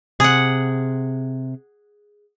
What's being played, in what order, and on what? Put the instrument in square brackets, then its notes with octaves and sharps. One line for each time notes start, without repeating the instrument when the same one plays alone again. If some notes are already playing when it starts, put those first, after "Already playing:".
[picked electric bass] C3 [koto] G#4 F#5